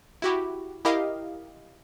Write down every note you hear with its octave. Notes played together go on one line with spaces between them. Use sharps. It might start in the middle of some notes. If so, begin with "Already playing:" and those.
E4 F#4 G4
E4 G4 A#4 D#5 F5